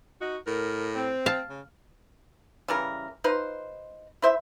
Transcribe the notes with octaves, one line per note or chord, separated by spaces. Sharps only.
D#4 F#4
A2 A#4
C4
F5 A5
C#3
C#3 E3 G3 A#4
D#4 F4 B4 C5
E4 C5 E5